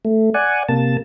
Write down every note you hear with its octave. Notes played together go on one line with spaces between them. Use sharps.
A3
D5 F#5 G#5
C3 A#3 A5